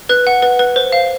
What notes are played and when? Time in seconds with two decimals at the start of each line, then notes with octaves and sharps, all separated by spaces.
0.09 B4 F#6
0.27 F#5
0.42 B4
0.59 B4
0.76 C5
0.92 F5